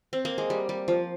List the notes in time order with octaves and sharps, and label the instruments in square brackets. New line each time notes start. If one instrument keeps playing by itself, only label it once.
[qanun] C4
A#3
G#3
G3
G3
F3